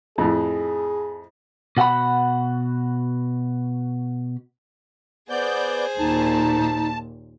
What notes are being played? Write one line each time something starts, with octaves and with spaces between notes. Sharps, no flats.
F2 A2 G#4
B2 F#4 G#4 F#5 B5
B3 G#4 C5 D5 G6
D#2 A#2 D#4 A5